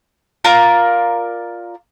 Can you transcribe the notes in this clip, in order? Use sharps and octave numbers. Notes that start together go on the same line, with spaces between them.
F4 A#4 D5 A#5